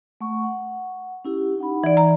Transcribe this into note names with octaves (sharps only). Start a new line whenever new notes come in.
A3 F#5 C#6
F#5
C#4 E4 G4
D#4 F#5 B5
E3 D5
A#5